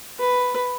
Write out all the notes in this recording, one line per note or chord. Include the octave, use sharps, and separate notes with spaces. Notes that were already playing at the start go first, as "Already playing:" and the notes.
B4